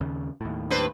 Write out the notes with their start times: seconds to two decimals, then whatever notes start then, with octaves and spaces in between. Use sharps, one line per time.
0.01 D#2 C#3
0.41 D#2 A2
0.70 G2 B4 C5